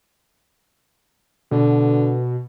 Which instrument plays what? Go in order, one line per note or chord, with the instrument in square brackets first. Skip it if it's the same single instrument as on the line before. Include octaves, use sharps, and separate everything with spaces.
[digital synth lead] B2 [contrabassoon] D3